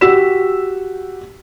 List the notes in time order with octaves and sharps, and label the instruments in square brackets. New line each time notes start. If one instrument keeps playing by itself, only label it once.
[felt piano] F#4 G4 E6 B6 E7